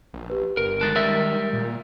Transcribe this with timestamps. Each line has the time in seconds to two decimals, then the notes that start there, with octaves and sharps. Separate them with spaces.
0.13 A#1
0.30 G4 B4
0.57 G1 A#4
0.81 D#3 G#3 A4 F#6 A6
0.96 D#3 G3 G#3 A#4 E5 E6
1.53 A#2